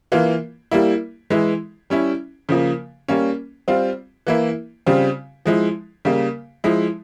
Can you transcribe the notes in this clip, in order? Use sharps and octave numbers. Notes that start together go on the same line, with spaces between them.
E3 A#3 F4
G3 A#3 E4
E3 G#3 E4
G3 C#4 E4
C#3 F3 A#3
G3 A#3 C#4
G3 C4 F4
E3 A#3 E4
C#3 G3 C4 F4
F3 G#3 E4
C#3 G3 A#3
F3 G#3 E4